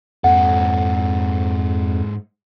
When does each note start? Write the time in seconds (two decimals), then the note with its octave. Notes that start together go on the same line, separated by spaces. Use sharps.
0.24 F2 G#2 A4 F#5